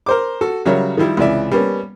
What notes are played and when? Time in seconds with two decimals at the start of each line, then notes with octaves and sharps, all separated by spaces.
0.06 A#4 C5 D6
0.41 F#4 A4
0.65 C#3 F#3 G3 A#4 C#5 E5
0.97 D#3 F3 G3 E4
1.17 C#2 C3 E3 D5 E5
1.52 G3 A#3 B3 C#4